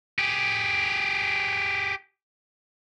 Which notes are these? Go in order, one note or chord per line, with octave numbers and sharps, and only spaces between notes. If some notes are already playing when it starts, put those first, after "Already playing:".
G4 G#4